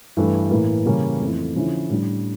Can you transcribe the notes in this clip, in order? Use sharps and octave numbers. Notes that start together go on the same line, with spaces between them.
G2 E3 A3 D4
A2 E3 A#3
C#3 E3 G3 A#3 C#4
F2 E3 A3 E4
D3 F3 C#4 E4
A2 G3 D4